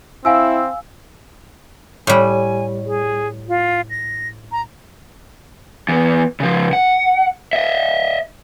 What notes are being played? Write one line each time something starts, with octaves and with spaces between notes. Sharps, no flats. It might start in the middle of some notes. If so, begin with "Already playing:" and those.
C4 E4 F5 G#5 E6
A2 G3 G#5
G#4
F4
A#6
A#5
E2 B3
C#3 F3
F#5
D#5 E5